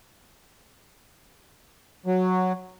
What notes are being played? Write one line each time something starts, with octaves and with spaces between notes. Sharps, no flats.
F#3